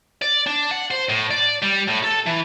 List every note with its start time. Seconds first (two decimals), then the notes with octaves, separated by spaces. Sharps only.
0.22 D5
0.47 D4
0.71 F#5
0.91 C5
1.10 A2
1.31 D5
1.62 G3
1.88 A2
2.04 A4
2.26 E3